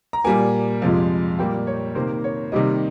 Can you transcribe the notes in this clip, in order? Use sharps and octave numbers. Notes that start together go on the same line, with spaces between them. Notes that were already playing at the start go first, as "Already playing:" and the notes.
A#5
A#2 G3 A#3 G#5
F2 C3 F3 G#3
A#2 G3 A#3 G5
C#5
C3 D#3 A#3 C5
C#5
C3 D#3 G3 A#3 D#5